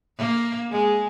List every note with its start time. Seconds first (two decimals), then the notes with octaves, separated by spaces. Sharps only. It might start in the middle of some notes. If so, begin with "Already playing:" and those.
0.17 A#3
0.72 G#3 G#4